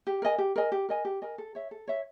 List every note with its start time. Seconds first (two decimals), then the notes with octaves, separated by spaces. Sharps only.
0.07 G4
0.22 A#4 D#5 G#5
0.38 G4
0.56 A#4 D#5 G#5
0.72 G4
0.89 A#4 D#5 G#5
1.05 G4
1.22 A#4 D#5 G#5
1.38 A4
1.55 C#5 E5
1.71 A4
1.88 C#5 E5